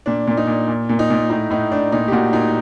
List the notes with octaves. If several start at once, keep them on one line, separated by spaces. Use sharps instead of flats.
A#2 D4
A#2
D#4
A#2
A#2
A#2
D#4
A#2
A2 D#4
A2 D#4
A2 D4
A#2 D#4
G4
A#2 F#4
A#2 D#4